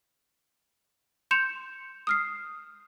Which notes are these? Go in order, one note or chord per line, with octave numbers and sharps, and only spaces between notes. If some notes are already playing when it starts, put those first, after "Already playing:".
C6 G6 C#7 E7 F7
D#6 F6 C7